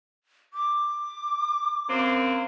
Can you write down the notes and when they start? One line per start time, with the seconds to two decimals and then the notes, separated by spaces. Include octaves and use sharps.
0.54 D6
1.88 F#2 A#3 C4